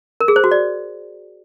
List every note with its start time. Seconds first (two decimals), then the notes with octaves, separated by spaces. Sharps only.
0.20 A#4
0.28 G#4
0.36 C5
0.44 F#4
0.51 D5